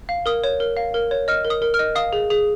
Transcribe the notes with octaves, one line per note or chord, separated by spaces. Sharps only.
F5
A#4 D#6
C#5
A#4
F5
A#4
C#5
D#5 F6
A#4
D#6
A#4
F6
D#5
F5 D#6
G#4
G#4